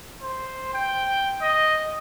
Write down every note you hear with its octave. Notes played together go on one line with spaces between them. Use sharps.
C5
G5
D#5